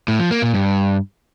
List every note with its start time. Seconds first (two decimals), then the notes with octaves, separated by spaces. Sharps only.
0.08 A2
0.20 F3
0.31 A#3
0.42 A#2
0.54 G2